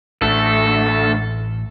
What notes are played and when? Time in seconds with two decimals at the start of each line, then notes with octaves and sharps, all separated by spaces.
0.22 A1 D3 A3 A4